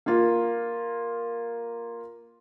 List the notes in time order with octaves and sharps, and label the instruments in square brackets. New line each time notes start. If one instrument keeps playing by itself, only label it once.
[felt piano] A#3 F4